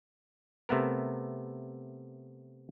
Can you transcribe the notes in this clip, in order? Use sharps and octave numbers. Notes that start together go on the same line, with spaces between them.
C3 A3 B3 A#4